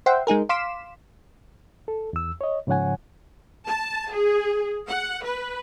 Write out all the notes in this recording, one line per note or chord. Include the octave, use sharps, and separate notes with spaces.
C5 E5 F#5 G5 C6
G#3 D#4 G#4 A#4
F5 C6 D6 B6 E7
A4
E2 E6
C#5 D#5
G#2 C#3 F3 C#5 F#5 G#5
A5
G#4
F#5
B4